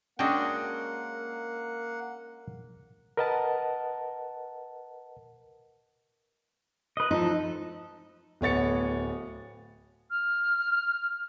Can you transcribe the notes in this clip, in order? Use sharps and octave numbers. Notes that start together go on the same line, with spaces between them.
G#3 A#3 C#4 D4 F#4 F#5 G5
A#4 B4 D#5 F#5 A5
B4 D#5
F3 D#4 A4
D1 B3 C#5 A6 C#7
F6